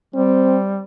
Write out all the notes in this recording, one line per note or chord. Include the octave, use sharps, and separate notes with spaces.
G3 C4